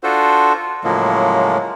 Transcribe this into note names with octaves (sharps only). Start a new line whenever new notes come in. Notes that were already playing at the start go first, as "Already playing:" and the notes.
D4 F4 F#4 A4 C5
A2 C#3 F3 F#3 G#3 A#3